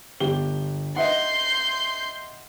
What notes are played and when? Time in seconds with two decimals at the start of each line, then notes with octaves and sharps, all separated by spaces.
0.20 G1 G4 G7
0.96 D#5 E5 F#5 C6 G6